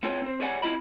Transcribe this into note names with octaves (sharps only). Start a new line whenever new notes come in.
B3 C4 F4 G#4 C#5 G5
C4 C5
G4 G#4 C#5 D5 F#5 G#5
C4 E4 F4 G4 D#5 B5